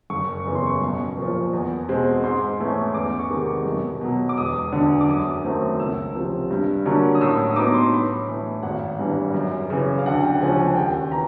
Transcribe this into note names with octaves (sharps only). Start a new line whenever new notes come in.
F#1 C#6
E2 C#3 E3 C#6
C6
C#6
B1
A#2 F3
E2
B2 G#3 C4
G#2 C6
E3 A3 C#4
E2 D6
C#6
C3 D#3 G#3 D6
B1
B2 F#3
D6
E1 D#6
D2 D3
D6
F#2 D#6
D#3 F#3 A3 C4
C#2 E6
C3 F3
G2
D3 F#3 A#3 C#4
D#6
A2 E6
D#6
F#3 B3 D#4 D6
C6
A2 B5
E3 A3
G#1 F#5
G2 E3
F#2
C#3 E3
F5
D2 F#5
G5
C#3 F3 G#3 C#4 G#5
F#5
D#2 G5
E3 A#5